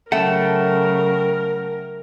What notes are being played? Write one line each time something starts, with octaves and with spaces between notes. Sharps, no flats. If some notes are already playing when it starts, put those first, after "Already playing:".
C#3 F#3 A3 A#4 F#5 G5 A5